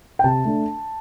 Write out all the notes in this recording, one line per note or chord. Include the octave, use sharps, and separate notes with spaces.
G5
C3 A5
A3 D4